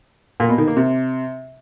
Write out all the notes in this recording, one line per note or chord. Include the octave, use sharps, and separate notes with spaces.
A#2
B2
D#3
A#3
C3